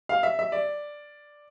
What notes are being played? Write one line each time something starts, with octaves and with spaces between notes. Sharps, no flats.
F5
E5
E5
D5